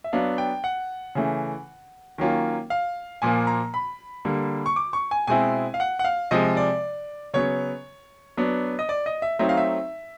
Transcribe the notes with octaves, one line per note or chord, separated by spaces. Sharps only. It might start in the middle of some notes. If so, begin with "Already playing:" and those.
E5
F#3 B3 D4 F5
G5
F#5
C#3 E3 A3
D#3 F#3 A#3 C#4 F4
F5
A#2 F3 A#3 G#5
A#5
B5
D3 G3 A#3
C#6
D6
C#6
G#5
B2 G#3 C4 E4 G#5
F5
F#5
F#5
F5
C3 F3 G#3 D#5
D5
C#3 F#3 B3 C#5
F#3 B3 D4
D#5
D5
D#5
E5
F#3 A3 C4 D#4 E5
F5
E5